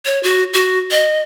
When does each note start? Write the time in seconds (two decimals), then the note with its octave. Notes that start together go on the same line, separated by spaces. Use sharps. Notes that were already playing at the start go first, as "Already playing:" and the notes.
0.05 C#5
0.23 F#4
0.54 F#4
0.91 D#5